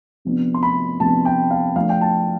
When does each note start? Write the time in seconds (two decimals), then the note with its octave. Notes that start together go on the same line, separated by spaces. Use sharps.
0.25 C3 F3 B3 D4
0.54 C6
0.63 B5
1.00 C3 F3 B3 D4 A5
1.25 G5
1.51 F5
1.76 F3 A3 D4 F5
1.89 G5
2.01 A5